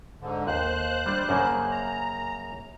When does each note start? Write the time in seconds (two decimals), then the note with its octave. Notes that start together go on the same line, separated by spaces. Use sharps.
0.21 G#2 D3
0.47 D#2 C5 F#6
1.06 G3 D4
1.29 F#2 C#3 A#3
1.72 A#5